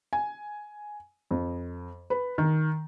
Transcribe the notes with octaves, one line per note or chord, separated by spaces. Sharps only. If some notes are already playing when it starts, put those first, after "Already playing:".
G#5
F2
B4
D#3